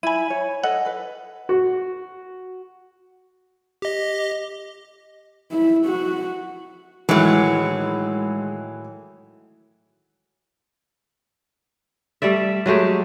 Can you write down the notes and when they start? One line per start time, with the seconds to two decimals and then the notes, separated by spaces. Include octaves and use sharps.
0.03 E4 G#5 B5 D#7
0.30 C#5
0.63 A4 D#5 F#5 G#5
0.86 B4
1.49 F#4
3.82 G4 D#5
5.52 E4
5.86 F#4
7.09 A2 D#3 E3 F#3 G#3
12.22 G3 A3 D5 E5
12.66 F#3 G#3 A3 G4